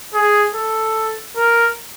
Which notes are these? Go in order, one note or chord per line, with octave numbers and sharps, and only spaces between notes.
G#4
A4
A#4